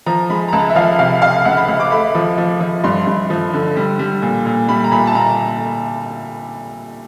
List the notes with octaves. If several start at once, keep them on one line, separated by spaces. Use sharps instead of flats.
F3 A#5
G#3 B5
A#5
C#2 A5
E5
F3 F5
C3 F5
C3 F5
C#2 F#5
B5
C#2
D6
A3 B5
F3
F3
F3
G2 C6
G2
F3
D3
G3
G3
A#2
A#2
G3 B5
A#5
A#2 B5
A5
A#2 A#5